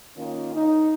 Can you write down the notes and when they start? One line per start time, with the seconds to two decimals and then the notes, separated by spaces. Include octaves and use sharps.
0.17 D#3 A#3 C#4 F4
0.55 D#4